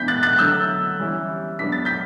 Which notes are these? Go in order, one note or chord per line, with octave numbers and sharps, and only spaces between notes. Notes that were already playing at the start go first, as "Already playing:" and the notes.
Already playing: E3 B3 D4 G6 B6
F#6 A6
F#6 A6
D3 F#3 A3 E6 G6
E3 G3 C#4 E4
F#3 B3 D4 B6
A6
G6 B6